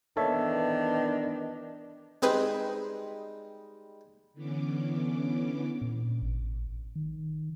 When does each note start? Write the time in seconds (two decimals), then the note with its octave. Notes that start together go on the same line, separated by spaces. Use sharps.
0.17 D#3 E3 B3 D4 A4 C#5 E5
2.22 G3 G#3 C4 D#4 G#4 B4
4.34 D3 E3 B3 C#4 D6
5.81 A#2
6.22 A1
6.96 D#3